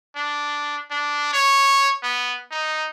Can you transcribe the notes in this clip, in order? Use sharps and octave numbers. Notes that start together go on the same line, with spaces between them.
D4
D4
C#5
B3
D#4